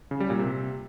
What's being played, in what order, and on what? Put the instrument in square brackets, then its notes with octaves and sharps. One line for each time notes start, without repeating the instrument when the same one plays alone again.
[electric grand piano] C#3
G3
A#2
C3